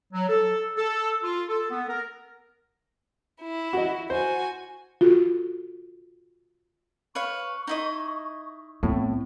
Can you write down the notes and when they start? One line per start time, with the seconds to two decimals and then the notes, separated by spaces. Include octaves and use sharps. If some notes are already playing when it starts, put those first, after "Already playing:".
0.13 F#3
0.29 A4
0.77 A4
1.24 F4
1.49 A4
1.71 B3
1.89 A#4
3.42 E4
3.73 F#4 D#5
4.10 F#4 C5 G#5
5.01 F4 F#4 A4
7.15 B4 C#5 F5 C#6
7.67 D#4 E4 D#5
8.83 A2 B3 C4